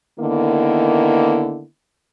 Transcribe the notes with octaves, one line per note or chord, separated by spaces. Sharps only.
D3 D#3 A#3 B3 E4